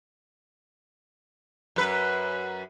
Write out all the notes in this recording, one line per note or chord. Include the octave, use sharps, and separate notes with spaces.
F#2 B4